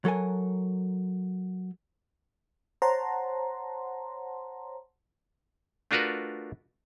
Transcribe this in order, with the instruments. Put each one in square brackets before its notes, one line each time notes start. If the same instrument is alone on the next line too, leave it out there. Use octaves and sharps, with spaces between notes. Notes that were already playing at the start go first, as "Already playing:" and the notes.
[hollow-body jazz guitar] F#3 A4 A#4 G#5
[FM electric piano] C5 C#5 F#5 A5 A#5 C6
[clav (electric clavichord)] A3 D4 F4 F#4 A#4 B4